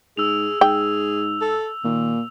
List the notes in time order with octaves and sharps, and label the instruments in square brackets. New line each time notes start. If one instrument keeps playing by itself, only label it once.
[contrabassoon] G#2 [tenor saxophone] G#4 [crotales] E6 F7
[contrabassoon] G#2 [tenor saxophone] G#4 [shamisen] G5
[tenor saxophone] A4
[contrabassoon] A#2 [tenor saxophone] D#3